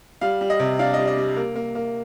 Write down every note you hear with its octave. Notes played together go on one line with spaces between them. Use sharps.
G3 F5
G3
D#5
C3
D4 F5
G3 D#5
D#5
G3
A#3
A#3
A#3